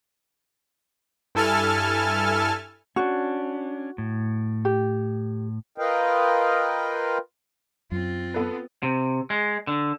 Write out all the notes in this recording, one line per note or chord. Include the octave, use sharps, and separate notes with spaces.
G2 E4 A4 G#5 A5 F6
C#4 D4 F#4
A2
G4
F4 A#4 B4 D#5 F5 G5
F#2 C4 F4
B3 A4 B4
C3
G#3
D3